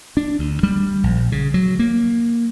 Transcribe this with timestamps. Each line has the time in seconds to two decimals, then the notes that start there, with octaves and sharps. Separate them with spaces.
0.17 D4
0.39 D2
0.63 G3
1.04 A#1
1.32 C#3
1.54 F#3
1.79 A#3